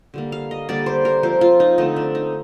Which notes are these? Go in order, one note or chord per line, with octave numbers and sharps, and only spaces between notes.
D3 G3 A#3
F5
D#5
D3 G3 A#3 D5
C5
A#4
F3 C4 C5
F4
D#4
D3 A3 C4 D#4
D4
D#4